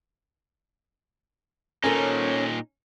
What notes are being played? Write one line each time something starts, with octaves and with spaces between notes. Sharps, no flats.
A#2 C#4 D#4 A4 A#4 C5